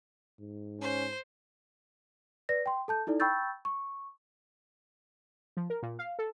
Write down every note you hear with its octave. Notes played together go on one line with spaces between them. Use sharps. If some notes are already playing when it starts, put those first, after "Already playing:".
G#2
C#4 C5
B4 D5 A#6
G5 C6
A4 A5 G6
D#4 E4 A4 D5
G5 B5 C#6 E6 G6 A6
C#6
F3
A#4
A#2
F5
A4